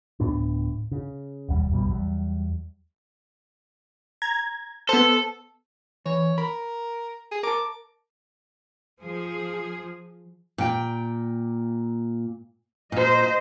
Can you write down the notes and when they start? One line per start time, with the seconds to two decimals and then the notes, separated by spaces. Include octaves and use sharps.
0.20 D1 A2 B3 D4
0.92 C#3
1.49 E1 D#2 G3
1.71 F1 A#1 B2 G3
1.91 E2 F#3 G3
4.22 A#5 G#6
4.89 B3 A4 C5
6.06 E3 C#5
6.38 A#4 B5
7.32 G#4
7.43 A#4 A5 D6
9.01 F3 G#4
10.58 A#2 G5
12.92 A#2 C5 D#5